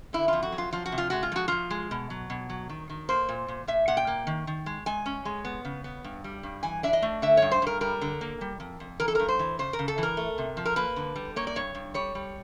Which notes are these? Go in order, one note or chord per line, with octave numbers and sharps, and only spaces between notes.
D3 E4
F2 F4
F#4
F#3
F4
F3 F4
F#4
C3
F4
G#3 F#4
F4
F3 F#4
F3 F4
G#3
B2
F#3
B2
F#3
D#3
D#3
A#3 C5
A#2
A#2
A#2 E5
A#2 F#5
G5
A#3
D#3
D#3
G#3
G#3 G#5
C#4
G#3
B3
C#3
B3
G2
G3
G2
E3 G#5
D4 E5
D#5
A3
D3 E5
G2 C#5
C5
G2 A#4
G3 A#4
D3
A#3
G3
F2
F2
E3 A#4
A4
G2 A#4
C5
E3
C#3 C5
A#4
C#3
A4
E3
A#4
A3
C3
F3
A#4
A#3 B4
D3
G3
A#3 C#5
D5
G2 C#5
G2
G3 C#5
G3